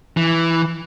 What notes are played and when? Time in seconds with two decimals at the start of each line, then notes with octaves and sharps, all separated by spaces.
0.17 E3